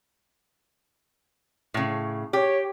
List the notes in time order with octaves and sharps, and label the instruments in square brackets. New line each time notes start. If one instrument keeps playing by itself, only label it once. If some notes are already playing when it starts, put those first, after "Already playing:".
[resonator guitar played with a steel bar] A2 C#3
[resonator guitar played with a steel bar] G4 [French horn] C#5